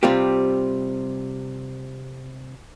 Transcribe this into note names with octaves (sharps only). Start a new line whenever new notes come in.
C3 G3 C4 F4 G4